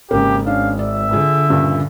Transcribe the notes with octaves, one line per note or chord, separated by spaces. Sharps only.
G#1 C#3 A#3 G4
C#4 D4 F5
D5 E5
D3 F4 G#4
G2 A#2 C#3